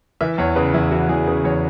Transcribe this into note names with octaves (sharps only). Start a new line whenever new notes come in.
E3 E5
E2 C#5
C#3 B4
E2 E4
E3 F#4
E2 G#4
C#3 B4
E2 C#5